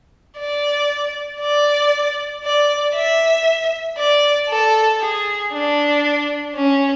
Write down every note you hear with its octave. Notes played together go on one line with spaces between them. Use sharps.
D5
D5
D5
E5
D5
A4
G#4
D4
C#4